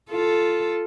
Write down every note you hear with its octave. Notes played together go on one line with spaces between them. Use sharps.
F4 A4